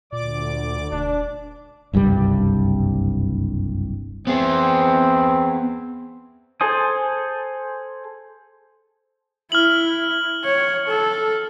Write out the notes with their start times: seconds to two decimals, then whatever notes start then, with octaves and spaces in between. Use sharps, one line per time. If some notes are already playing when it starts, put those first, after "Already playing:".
0.12 D2 A#2 D5 D6
0.92 E1 D4
1.93 F#1 C2 G2 G3
4.27 B3 C4 G#4
6.61 G#4 A4 C5 G#5 D#6
9.52 E4 F6 F#7
10.45 C#5
10.88 A4